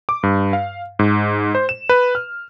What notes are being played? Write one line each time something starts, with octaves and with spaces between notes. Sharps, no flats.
D6
G2
F5
G#2
C5
E7
B4
F6